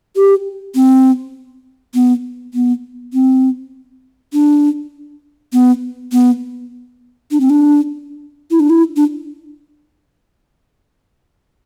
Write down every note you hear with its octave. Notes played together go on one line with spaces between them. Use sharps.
G4
C4
B3
B3
C4
D4
B3
B3
D4
C4
D4
E4
D4
E4
D4